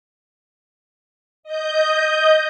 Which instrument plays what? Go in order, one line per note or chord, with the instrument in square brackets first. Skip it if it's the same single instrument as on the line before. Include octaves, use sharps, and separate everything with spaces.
[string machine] D#5 G6